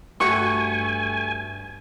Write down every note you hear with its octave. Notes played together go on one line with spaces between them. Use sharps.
G2 A3 F#4 G4 G#5 C#6